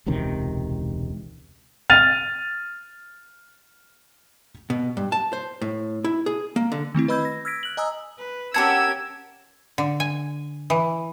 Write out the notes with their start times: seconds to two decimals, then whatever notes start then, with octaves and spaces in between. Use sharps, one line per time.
0.06 E1 C#2 C3 D#3
1.90 F6 A6 D#7 F7
4.70 B2
4.97 G2
5.12 A5
5.33 C5
5.62 A2
6.04 E4
6.26 G#4
6.56 A#3
6.72 D3
6.95 D#3 A3 C4 E4
7.08 B4 D#5 B5 E6 G6 G#6
7.25 A#6
7.45 E6 F6 G#6 A#6 B6 D7
7.63 F#6 F#7
7.77 D#5 G#5 A#5 D#6 E6
8.18 B4
8.54 C#4 G4 A#4 F#5 A5 D6 E6 G#6
9.78 D3
10.00 G#5
10.70 E3